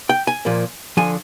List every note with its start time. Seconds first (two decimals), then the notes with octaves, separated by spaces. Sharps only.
0.09 G5
0.27 G#5
0.45 A#2 F3 A#3
0.97 D3 F3 G#5